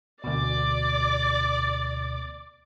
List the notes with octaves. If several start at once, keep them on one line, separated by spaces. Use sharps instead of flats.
D2 B2 D5 D6